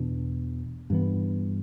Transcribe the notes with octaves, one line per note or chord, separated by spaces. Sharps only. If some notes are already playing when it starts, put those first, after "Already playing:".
Already playing: E2 B2 D4
G2 E3 B3